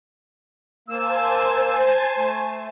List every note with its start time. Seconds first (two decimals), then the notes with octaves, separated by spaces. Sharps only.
0.88 A#3 C5 G#5 A5 E6
2.17 A3